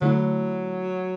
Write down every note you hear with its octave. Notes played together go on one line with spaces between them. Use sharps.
D3 F#3 A3 E4